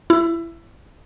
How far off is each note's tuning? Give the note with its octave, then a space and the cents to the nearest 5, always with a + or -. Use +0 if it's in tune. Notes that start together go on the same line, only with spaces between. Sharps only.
E4 +20